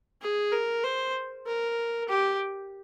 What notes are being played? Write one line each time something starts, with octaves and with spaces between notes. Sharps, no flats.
G#4
A#4
C5
A#4
G4